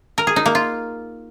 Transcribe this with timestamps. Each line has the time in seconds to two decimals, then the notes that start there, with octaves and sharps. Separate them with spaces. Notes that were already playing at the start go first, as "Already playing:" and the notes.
0.18 A#4
0.27 G#4
0.36 D#4
0.46 A#3
0.55 F4